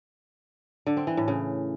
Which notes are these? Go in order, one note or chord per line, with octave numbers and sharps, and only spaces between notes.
D3
C4
E3
A2
C#3